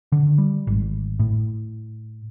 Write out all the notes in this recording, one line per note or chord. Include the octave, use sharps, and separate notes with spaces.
D3
G3
G#1
A2